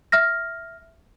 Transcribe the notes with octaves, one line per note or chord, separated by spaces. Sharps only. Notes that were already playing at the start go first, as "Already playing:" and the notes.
E5 F6 A#6